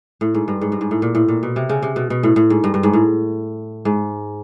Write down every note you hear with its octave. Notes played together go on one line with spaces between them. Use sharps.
A2
G#2
G2
G#2
G2
G#2
A2
A#2
A2
A#2
B2
C3
C#3
C3
B2
B2
A2
A2
G#2
G2
G2
G#2
A2
G#2